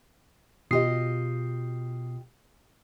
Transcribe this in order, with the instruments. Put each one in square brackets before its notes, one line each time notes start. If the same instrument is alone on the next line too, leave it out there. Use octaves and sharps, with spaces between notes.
[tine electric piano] B2 D#6 C7 [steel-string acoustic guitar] F4 G4 D#5